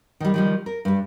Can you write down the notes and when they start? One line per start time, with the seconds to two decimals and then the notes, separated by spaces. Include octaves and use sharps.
0.20 D#3 G3
0.34 D#3 F3 G3
0.66 A#4
0.85 G2 G3